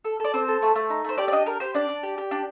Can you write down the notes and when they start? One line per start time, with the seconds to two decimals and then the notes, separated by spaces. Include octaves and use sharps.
0.04 A4
0.20 A4 D5
0.34 C4 C5
0.48 A4
0.62 A3
0.75 A3
0.90 D#4
1.04 A3 C5
1.18 G4 D5
1.28 D5
1.32 D4 D#5
1.46 G4 A#4
1.60 G4 C5
1.74 D4 D5
1.89 D4
2.03 G4
2.18 G4
2.31 D4